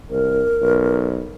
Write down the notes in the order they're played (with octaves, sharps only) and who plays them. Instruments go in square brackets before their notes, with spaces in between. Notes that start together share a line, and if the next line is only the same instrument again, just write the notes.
[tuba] C2 [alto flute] A#4
[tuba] B1